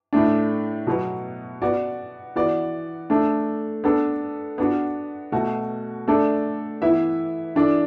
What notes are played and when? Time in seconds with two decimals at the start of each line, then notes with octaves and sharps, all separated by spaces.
0.13 A2 A3 D4
0.87 B2 F#3 B3
1.62 B3 F#4 D5
2.35 E3 B3 F#4 D5
3.10 A3 D4 A4
3.84 B3 D4 A4
4.58 B3 D4 F#4
5.32 B2 A3 F#4
6.07 A3 D4 A4 D5
6.82 E3 B3 E4 B4 E5
7.55 E3 D4 A4 D5